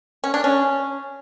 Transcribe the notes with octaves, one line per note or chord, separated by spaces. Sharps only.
C#4
D4
C#4